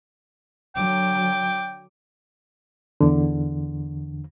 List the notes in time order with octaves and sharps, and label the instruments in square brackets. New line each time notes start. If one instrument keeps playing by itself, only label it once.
[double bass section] D3 F#3 [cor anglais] G5 [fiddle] D6
[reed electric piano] E2 D3